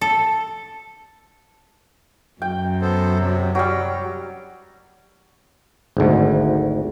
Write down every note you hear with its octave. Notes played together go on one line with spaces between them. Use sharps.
A4
F#2 G5
B3 A4 C5
C3 F#3
F#3 G3 G5
G#1 D2